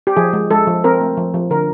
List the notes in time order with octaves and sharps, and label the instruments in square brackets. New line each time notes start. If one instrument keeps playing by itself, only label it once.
[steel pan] G4
F3 G#4
G#3
G#3 A4
F3
C4 A#4
A3
F3
F3
D3 A#4